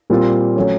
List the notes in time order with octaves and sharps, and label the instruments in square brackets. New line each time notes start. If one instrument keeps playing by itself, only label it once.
[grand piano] A#2 G3 C4 F4
F#3 A3 C#4